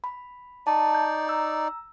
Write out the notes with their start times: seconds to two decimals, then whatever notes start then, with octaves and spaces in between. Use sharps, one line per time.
0.04 B5
0.67 D#4 D5 A5
0.95 G6
1.27 A#5 E6